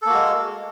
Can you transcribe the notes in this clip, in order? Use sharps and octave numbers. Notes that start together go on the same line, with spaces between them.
G#3 A#3 F#4 A4